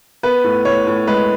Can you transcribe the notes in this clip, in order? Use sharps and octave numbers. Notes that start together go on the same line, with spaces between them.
B3 B4
A2
A2 C#5
A2
G#3 B4